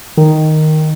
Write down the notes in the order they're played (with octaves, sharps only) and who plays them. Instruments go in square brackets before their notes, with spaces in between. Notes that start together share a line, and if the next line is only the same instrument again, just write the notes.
[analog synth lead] D#3